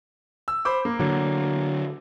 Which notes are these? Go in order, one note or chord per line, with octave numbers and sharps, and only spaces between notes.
E6
C5 B5 D6
A#3
D3 F#3